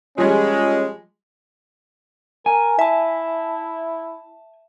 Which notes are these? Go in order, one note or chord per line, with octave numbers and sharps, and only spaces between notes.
F3 G3 G#3 C#4
A#4 G#5
E4 E5 A5